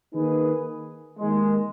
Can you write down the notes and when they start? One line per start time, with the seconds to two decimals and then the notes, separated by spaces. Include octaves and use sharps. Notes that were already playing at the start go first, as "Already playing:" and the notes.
0.13 D#3 A#3 D#4 G#4 B4
1.20 D#2 D#3 G#3